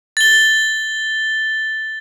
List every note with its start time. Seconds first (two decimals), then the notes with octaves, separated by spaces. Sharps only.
0.17 A6 G7